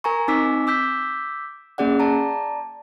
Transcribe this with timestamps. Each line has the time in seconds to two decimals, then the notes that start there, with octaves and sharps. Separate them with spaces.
0.04 A#4 G#5 A#5 C#6
0.28 C4 D#4 G#5 D6 E6 B6
0.67 D6 E6 G6 B6
1.78 A#3 C#4 G#4 D5 F#5
1.99 D5 A5 A#5